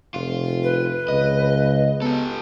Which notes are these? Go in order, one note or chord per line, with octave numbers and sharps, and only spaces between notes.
F1 F4
B4
C#2 D#5
B3 G4 A4